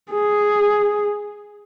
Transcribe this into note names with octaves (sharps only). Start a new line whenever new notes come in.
G#4